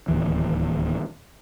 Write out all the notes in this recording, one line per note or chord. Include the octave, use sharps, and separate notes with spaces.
D1 A1 D#2 E3